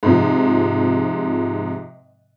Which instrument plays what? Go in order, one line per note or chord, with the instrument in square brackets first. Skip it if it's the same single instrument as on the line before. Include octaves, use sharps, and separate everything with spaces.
[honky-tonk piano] G#2 C3 F3